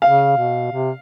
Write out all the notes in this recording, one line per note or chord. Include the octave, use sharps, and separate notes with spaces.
C#3 F5
B2
C3